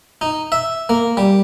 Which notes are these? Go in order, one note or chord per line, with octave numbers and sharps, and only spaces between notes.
D#4
E5
A#3
G3